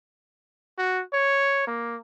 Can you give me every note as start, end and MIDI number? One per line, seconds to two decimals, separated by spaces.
0.78 1.02 66
1.13 1.63 73
1.67 1.97 58